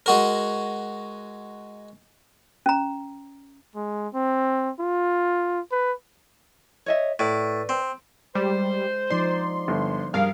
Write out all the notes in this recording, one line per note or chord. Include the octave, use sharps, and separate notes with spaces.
G#3 F#4 A#4
C#4 A#5
G#3
C4
F4
B4
C#5 D#5 E5
A2 B4 D5
C4
G3 G#3 C5
F3 D#4 D5 C6
G1
G2 G#4 A#4 F5